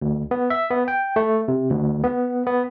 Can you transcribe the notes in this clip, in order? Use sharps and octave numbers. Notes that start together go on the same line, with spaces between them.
D2
B3
E5
B3
G5
A3
C3
D2
B3
B3